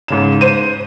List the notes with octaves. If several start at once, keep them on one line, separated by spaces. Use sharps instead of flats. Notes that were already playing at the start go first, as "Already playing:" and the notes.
G#2 C#3 E7
C5 D#7